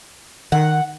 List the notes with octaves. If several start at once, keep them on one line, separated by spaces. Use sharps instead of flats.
D#3 F#5